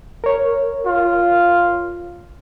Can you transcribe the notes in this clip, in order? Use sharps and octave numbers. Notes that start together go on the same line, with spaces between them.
A#4 C#5
F4